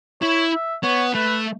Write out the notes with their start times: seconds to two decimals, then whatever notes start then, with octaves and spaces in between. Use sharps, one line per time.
0.22 E4 C#5
0.53 E5
0.83 B3 C#5
1.15 A3 B4